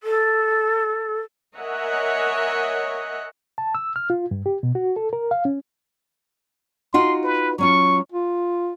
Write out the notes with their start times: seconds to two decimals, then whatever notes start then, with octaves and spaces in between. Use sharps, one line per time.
0.03 A4
1.55 A#4 C#5 D#5 E5 F#5 G#5
3.58 A5
3.75 E6
3.96 F6
4.10 F4
4.31 G2
4.46 G4
4.63 B2
4.75 F#4
4.96 A4
5.13 A#4
5.31 F5
5.45 C#4
6.94 D#4 F4 F#4 C6
7.24 B4
7.58 F#3 C#4 F4 C#6
8.12 F4